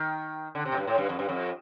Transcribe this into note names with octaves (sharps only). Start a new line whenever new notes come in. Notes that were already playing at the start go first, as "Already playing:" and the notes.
Already playing: D#3
D3
C3
A2
G2
A2
G2
F2
G2
F2